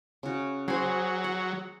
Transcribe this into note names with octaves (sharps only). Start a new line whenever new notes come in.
C#3 F#4
F#3 G#4 C5
F#5